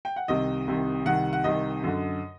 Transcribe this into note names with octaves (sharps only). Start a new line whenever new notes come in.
G5
F#5
C2 C3 D#3 D#5
C2 C3 D#3
C2 C3 D#3 F#5
F#5
C2 C3 D#3 D#5
F#2 D3